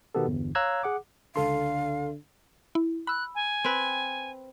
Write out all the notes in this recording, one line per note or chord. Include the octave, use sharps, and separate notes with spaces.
B2 D#3 B3 G4 A4
G1 E2
C#5 F5 A#5 E6 F#6 G#6
G#4 F#5 D6
C#2 D3 A4 F5 C6
E4
B5 E6 F#6
G#5
C4 B4